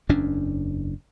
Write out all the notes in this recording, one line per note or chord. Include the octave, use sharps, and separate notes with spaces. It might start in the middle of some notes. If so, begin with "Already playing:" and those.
F#1 E2 C#4 D4